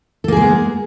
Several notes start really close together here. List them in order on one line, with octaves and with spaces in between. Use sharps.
A4 A#3 G#4 G#3 B3